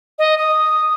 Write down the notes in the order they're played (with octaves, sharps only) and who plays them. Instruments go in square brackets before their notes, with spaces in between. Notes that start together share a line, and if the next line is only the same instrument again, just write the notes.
[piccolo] D#5
D#6